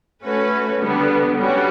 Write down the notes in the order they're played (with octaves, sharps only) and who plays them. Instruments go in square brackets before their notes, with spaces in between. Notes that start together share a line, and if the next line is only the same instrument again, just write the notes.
[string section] A3 C#4 F#4 B4
D3 G3 B3
G3 C#4 F#4